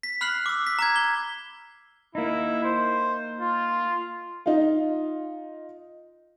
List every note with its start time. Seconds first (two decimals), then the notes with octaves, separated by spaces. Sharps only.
0.03 B6
0.21 B5 F6 F#6 C7 F#7
0.46 D6 E6
0.67 B6
0.79 A#5 D6 G#6
0.96 G7
2.15 A#3 D#4 E4
2.64 C5
3.40 F4
4.46 D#4 F4